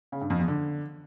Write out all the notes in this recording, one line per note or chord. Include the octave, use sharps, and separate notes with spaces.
C#3
G2
F2
E2
D3